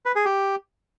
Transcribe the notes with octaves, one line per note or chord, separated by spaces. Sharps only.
B4
G#4
G4